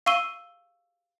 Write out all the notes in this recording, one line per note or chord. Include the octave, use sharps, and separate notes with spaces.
F5 C#6 E6 D#7 G7